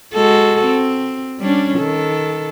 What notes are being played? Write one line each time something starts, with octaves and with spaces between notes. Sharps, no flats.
G#3 F#4 A4
C4
G3 C#4 D4
D#3 A4